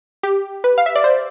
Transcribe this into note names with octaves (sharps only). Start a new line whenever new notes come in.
G4
B4
F5
E5
D5
C5